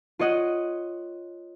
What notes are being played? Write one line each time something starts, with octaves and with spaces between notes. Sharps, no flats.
F4 C#5 D#5 F#5